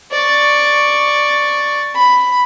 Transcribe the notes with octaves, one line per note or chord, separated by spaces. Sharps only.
D5 C#6
B5